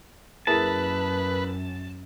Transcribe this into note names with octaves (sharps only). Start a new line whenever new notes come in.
F#2 A#3 E4 G#4 B4 A5